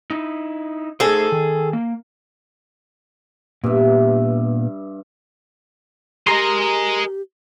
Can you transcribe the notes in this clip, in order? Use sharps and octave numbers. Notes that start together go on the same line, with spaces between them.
D#4 E4
A3 D#4 G#4 A4 C5
D#3
A#3
G2 A#2 B3 E5
G4 G#4 A#4 D#5 A#5 C6